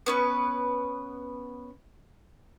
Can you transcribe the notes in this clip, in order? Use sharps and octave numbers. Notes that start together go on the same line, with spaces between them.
B3 C#4 B4